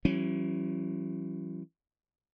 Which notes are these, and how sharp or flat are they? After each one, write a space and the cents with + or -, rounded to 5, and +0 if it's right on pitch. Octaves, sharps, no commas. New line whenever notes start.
E3 +15 G3 -45 C#4 -25